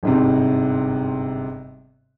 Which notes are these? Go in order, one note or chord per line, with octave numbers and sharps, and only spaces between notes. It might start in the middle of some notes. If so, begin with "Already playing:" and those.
G1 G#2 C3